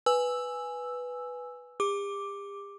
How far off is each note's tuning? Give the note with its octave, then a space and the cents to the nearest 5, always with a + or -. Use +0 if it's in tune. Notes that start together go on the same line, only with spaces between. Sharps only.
B4 +0 G#5 +0 E6 +0
G4 +45 D6 +0